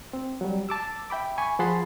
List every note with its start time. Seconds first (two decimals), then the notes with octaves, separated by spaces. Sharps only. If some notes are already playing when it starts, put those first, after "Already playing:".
0.13 C4
0.41 F#3 G3
0.69 A5 D6 E6
1.10 E5 G5 B5 D6
1.38 G#5 B5 C#6
1.59 F3 G#4 F#5 A5 B5 C6